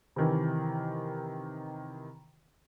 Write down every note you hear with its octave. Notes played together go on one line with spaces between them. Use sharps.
C3 D#3 E3